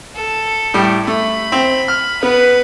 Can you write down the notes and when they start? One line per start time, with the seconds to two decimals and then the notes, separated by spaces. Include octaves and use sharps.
0.16 A4
0.74 A2 G3
1.07 A3 B5
1.52 C4
1.88 F6
2.23 B3 B4